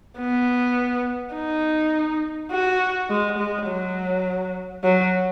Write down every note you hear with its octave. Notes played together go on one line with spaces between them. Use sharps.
B3
D#4
F#4
G#3
G#3
F#3
F#3